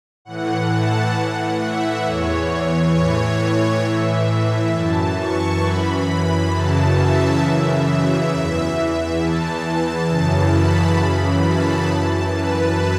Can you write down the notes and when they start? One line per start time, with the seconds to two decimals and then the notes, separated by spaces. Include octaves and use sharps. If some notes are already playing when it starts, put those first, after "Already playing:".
0.25 A2 E3 F#5
0.70 A5
1.14 A2 E3 F#5
1.59 E5
2.04 E2 E3 C#5
2.93 A2 E3 C#5
3.38 C#5
3.83 A2 E3 E5
4.72 F#2 E3 A5
5.17 C#6
5.62 F#2 E3 B5
6.06 B5
6.51 F#2 C#3 E3 A5
6.95 E5
7.40 F#2 C#3 E3
8.29 E2 E3
8.75 E5
9.19 E2 E3 A5
10.09 F#2 C#3 E3
10.53 B5
10.97 F#2 C#3 E3
11.43 A5
11.87 F#2 E3
12.31 B4